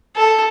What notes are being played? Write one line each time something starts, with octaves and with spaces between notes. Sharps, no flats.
A4